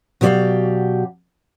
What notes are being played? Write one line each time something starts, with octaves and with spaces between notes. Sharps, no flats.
B2 F#3 G4 C#5 D5 F5